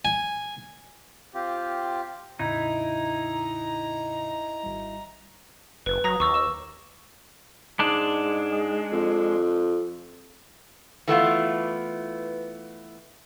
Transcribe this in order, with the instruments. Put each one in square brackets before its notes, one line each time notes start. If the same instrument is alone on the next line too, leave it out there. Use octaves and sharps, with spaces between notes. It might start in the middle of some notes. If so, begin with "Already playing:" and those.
[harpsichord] G#5
[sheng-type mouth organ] C4 F4 G4
[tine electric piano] E2 A2 C#3 [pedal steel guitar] D#4 E4 [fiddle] A#5
[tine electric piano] G#1 G3
[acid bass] F#1 [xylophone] B4
[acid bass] F#3 [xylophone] A#5 D#6 A#6
[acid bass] D#2 [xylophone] C#6 D6 E6
[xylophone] E6 E7
[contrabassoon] G#2 [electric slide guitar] G#3 D4
[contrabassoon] F2
[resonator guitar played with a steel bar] E3 A3 B3 F4